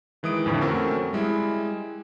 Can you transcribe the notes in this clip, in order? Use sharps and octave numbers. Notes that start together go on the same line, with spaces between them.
D#3 E3 G#3 D#6 D7
F2 A2 D3 E3
A3 C4 C#4 F#4 A4 A#4
G3 G#3 E4